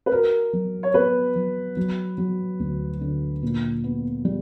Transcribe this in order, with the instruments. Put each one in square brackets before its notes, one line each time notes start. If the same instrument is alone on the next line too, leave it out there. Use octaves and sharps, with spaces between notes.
[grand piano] B4
[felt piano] F#4 [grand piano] A#4
[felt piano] F#3
[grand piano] C#5
[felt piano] B3 [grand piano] B4
[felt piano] F#3
F#3
F#3
D2
D3
A#2
B3
G3